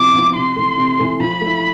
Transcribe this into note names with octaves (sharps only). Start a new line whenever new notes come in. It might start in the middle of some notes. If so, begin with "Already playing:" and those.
Already playing: C3 F3 B3 E4 D6
F3 B3 E4
C3 C6
E3 A3
C3
E3 A3
F3 B5
A3 E4